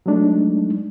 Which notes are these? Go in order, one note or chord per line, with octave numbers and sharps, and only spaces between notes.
F#3 G#3 A3 D4 D#4